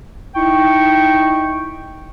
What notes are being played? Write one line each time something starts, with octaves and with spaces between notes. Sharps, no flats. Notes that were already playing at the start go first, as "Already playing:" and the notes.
D#4 E4 G5 C#6